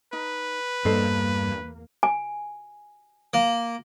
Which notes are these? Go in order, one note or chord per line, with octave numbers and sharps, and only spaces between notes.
D#4 B4
E2 G2 G3 A#3 A4 C5 D#5
G#5
A#3